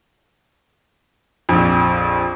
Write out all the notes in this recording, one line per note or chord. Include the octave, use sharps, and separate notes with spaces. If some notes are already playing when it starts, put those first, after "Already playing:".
A#1 F2